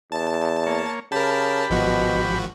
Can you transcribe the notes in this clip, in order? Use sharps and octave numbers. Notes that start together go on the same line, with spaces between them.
E2 A5
A#3 C#5
C#3 G4 A#4 A5 B5
G#1 B2 F3 F#4